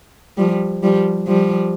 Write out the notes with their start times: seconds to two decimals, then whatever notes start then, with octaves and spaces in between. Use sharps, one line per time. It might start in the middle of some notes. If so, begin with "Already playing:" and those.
0.37 F3 G3
0.83 F3 G3
1.27 F3 G3